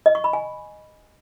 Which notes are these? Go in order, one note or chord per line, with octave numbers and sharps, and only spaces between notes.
D#5
C#6
B5
G#5